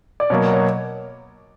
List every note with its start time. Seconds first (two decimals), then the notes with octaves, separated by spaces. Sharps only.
0.20 D5
0.30 B2 F#3 A#3 C#5
0.53 C#5